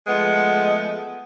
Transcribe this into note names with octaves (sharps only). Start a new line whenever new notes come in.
F3 G#3 A3 B3